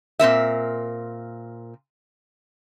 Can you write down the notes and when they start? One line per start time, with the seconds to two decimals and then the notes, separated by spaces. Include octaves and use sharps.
0.19 A#2 C4 A#4 E5